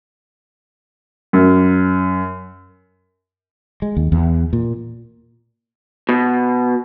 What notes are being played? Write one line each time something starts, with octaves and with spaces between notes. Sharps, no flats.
F#2
G#3
D#2
E2
A#2
B2